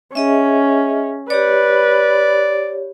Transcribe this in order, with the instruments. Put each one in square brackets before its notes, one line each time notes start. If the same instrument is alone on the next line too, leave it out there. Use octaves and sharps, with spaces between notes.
[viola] C#4 [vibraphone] G#4 D#5 E5
[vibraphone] G4 C#5 [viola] B4 [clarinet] D5